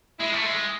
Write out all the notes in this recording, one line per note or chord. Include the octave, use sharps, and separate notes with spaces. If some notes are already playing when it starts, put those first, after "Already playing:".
G#3 E4
A3
G#3